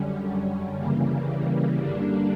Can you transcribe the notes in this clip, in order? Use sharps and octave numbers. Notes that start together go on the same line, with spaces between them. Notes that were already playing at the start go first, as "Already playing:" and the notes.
Already playing: F#2 D3 G3 C#4
C#3 E3 G3 A#3
G2 D3 G3 A#3 D4